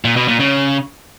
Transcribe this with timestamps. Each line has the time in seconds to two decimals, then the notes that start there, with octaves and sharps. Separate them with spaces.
0.05 A#2
0.16 B2
0.28 A#2
0.40 C#3